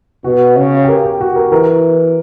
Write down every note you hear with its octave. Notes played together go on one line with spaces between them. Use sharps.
B2 F#4
C#3
G4
A#4
G4
F#4
A#4
E3 A#4